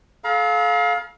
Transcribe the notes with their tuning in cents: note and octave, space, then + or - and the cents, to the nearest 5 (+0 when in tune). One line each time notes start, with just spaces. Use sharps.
A4 -40 F5 +15 A#5 +45